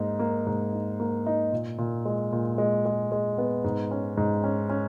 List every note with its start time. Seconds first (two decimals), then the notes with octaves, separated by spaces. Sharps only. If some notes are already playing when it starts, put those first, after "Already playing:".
Already playing: G#2 A#3 D#4
0.19 A#3
0.47 G#2
0.72 D#4
1.00 A#3
1.26 D#4
1.52 A#2
1.78 A#2
2.05 G#3
2.32 A#2
2.58 G#3
2.85 G#3
3.12 G#3
3.38 B3
3.64 G#2
3.91 C#4
4.17 G#2
4.44 C#4
4.70 C#4